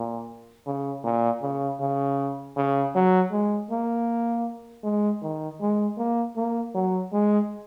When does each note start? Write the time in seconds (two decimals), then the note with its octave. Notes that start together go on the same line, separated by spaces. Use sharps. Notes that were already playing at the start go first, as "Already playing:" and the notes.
Already playing: A#2
0.67 C#3
1.04 A#2
1.42 C#3
1.80 C#3
2.57 C#3
2.94 F#3
3.32 G#3
3.71 A#3
4.84 G#3
5.22 D#3
5.61 G#3
5.98 A#3
6.36 A#3
6.75 F#3
7.13 G#3